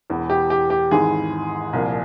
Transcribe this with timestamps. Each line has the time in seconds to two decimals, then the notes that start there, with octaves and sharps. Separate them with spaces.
0.10 E1 E2 E3
0.30 G4
0.50 G4
0.70 G4
0.91 G#1 G#2 E3 G#4
1.73 C2 A#2 F3